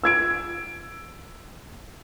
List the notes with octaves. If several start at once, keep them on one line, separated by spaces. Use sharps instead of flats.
E6 G#6 D7